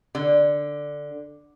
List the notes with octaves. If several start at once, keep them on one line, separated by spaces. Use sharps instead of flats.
D3